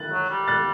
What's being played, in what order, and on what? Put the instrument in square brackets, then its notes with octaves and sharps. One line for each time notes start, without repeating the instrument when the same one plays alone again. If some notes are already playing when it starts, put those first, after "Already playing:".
Already playing: [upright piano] F#6 A6
[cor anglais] F#3
G3
[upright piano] F#6 A6